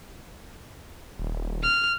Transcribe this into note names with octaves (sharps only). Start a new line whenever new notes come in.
D#1
F6